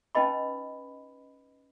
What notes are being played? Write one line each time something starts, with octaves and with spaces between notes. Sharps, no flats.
C#4 D#4 B4 D#5 B5